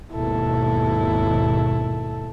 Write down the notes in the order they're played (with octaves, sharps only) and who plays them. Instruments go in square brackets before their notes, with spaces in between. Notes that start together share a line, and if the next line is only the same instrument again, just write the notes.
[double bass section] G#1 D#2 B2 [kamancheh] E4 A4